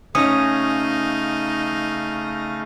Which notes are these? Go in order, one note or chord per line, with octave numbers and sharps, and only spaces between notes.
C#3 A3 C#4 D#4 F5 D#6